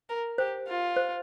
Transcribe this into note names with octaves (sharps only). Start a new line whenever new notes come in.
A#4
G4 C5
F4
C5